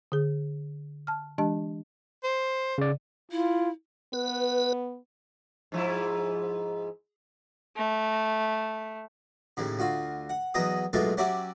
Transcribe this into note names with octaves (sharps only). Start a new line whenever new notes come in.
D3 G#4
A5 F6
E3 G#3 D4 G4 D#5 A5
C5
C#3 D5
E4 F4
B3 B4
G#2 F3 E4
A3
D#2 A2 C#3
D2 F4 F#4
F#5
E2 F#3 B3 B4 D#5 D#6
B1 B2 G#3 A3 F4 A4
F#3 C#4 G4 D5 E5 F#5